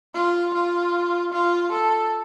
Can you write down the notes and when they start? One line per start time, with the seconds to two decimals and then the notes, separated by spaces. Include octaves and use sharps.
0.14 F4
0.54 F4
1.32 F4
1.72 A4